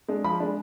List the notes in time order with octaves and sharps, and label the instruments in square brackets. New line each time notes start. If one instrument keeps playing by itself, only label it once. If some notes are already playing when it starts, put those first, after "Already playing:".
[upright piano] G#3 D4
F3 B5
G#3 D4